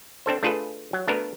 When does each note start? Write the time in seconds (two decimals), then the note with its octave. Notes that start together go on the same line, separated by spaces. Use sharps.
0.26 C4 D4 A4 C5
0.43 A3 D4 F4 G#4 A4 B4
0.93 F#3
1.08 A3 B3 D4 F#4 A#4 B4